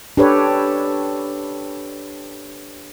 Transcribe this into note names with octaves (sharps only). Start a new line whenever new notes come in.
D4 G4 A4 B4 C#5